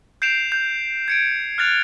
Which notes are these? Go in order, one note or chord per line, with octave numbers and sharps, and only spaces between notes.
G6 C7 D7 E7 F7
G6
G#6 C#7 D7
F6 F#6 A6 F7